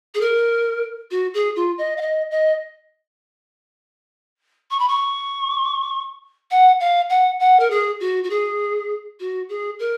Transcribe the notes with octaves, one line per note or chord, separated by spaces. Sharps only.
G#4
A#4
F#4
G#4
F4
D#5
F5
D#5
D#5
C#6
B5
C#6
F#5
F5
F#5
F#5
A#4
G#4
F#4
F#4
G#4
F#4
G#4
A#4